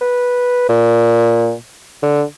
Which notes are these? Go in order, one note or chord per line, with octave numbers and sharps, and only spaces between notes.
B4
A#2
D3